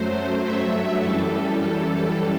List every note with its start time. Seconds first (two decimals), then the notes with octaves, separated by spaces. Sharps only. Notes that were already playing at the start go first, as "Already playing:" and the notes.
Already playing: F#2 F#3 A3 C5
0.44 G2 F#3 A3 E5
1.00 F#2 E3 G3 A4